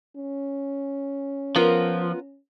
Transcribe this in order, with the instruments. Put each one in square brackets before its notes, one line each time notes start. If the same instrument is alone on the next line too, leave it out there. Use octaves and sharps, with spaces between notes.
[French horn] C#4
[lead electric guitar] F3 [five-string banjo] B3 F4 A#4